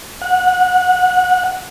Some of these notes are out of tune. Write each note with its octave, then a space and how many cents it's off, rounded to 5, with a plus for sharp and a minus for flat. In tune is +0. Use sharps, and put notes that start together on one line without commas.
F#5 -25